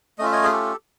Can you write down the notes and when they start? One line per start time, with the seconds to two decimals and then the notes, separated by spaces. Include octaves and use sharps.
0.18 A3 D#5
0.21 C#4 F4 E5
0.32 C#5 D#5
0.44 G#4
0.52 G4 A4